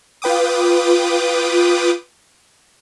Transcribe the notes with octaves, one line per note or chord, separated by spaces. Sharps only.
F4 B4 G5 D6 D#6